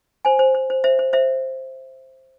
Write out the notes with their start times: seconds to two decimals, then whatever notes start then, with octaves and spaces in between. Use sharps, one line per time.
0.25 C5 G#5
0.39 C5
0.55 C5
0.70 C5
0.84 C5 E5
0.99 C5
1.13 C5 E5